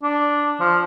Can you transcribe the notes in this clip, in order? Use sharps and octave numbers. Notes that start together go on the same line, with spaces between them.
D4
F3